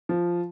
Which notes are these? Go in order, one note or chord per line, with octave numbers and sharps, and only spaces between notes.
F3